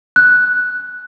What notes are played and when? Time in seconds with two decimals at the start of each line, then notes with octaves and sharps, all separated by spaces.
0.16 F#6